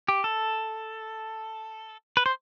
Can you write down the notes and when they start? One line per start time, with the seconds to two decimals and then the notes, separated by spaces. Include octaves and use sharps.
0.08 G4
0.24 A4
2.17 B4
2.26 C5